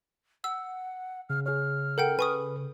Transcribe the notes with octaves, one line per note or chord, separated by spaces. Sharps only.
F#5 E6
C#3 F6
G#4 C#5 F6
A4 A#4 F#5 G5 G6
B4 G#5 C#6 D#6